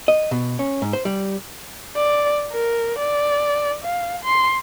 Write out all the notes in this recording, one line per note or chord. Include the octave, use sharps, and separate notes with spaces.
D#5
B2
C#4
G#2
C5
G3
D5
A#4
D5
F5
C6